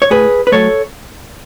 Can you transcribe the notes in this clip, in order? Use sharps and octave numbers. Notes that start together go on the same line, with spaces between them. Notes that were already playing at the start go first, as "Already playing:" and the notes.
C#5
A2 G#4 B4
B4
F#3 A3 A4 C#5